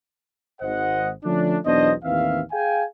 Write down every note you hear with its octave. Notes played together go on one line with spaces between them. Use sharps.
G#1 C5 D#5 F#5
D3 F3 A3 C#4 D4
B1 E2 B3 D4 C5 D#5
A1 D#2 E3 C4 E5 F5
G#4 F5 G5 G#5